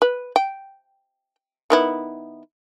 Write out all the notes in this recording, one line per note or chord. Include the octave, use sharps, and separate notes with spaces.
B4
G5
D#3 B3 E4